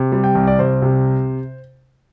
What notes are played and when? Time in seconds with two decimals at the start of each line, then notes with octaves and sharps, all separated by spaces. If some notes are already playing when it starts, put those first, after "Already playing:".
Already playing: C3
0.12 G3
0.24 G5
0.35 C2
0.47 D5
0.59 C2 C5
0.82 C3